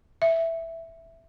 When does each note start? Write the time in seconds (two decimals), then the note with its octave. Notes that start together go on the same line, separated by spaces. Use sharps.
0.22 E5